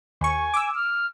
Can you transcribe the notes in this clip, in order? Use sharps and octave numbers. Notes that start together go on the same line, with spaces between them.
D#2 G#5 C#6
D6 E6
F6